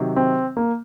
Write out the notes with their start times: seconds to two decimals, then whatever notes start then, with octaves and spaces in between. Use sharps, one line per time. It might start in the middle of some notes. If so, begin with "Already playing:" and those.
Already playing: C3 D#3 F#3
0.16 C4
0.57 A#3